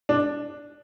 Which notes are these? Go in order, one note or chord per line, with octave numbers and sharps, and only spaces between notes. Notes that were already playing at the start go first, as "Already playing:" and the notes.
D4